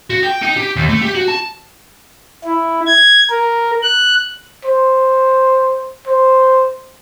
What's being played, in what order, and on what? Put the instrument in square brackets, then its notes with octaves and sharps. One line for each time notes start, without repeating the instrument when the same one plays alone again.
[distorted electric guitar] F#4
G5
D#4
G4
D#2
A3
G4
F#4
A5
[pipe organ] E4
G#6
A#4
F#6
[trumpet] C5
C5